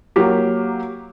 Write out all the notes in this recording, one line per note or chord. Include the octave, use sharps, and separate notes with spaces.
F#3 A#3 G4